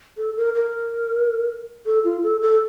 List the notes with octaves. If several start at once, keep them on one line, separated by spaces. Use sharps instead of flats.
A4
A#4
A#4
A4
F4
A4
A4